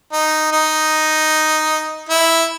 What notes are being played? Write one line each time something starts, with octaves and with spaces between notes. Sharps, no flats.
D#4
D#4
E4